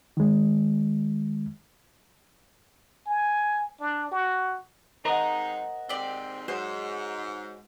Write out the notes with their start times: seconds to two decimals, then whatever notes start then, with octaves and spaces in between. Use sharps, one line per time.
0.17 D#3 G#3
3.06 G#5
3.80 D4
4.12 F#4
5.05 G#3 C4 D#4 A#4 C5 D#5 F#5 A#5
5.89 D#2 G#2 C4 G4 D5
6.48 G#2 F#4 C5 C#5